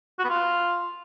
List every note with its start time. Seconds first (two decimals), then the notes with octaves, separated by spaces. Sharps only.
0.19 F#4
0.24 B3
0.30 F4